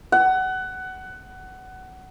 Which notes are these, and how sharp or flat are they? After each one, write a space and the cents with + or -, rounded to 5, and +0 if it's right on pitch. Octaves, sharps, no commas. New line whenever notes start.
F#5 +20